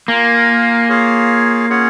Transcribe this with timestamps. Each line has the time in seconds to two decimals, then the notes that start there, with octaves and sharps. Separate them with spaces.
0.08 A#3 F4 A#4 F5 G#5
0.89 F4 G#4 C#5 F5
1.69 C#4 F4 G#4 C#5 F#5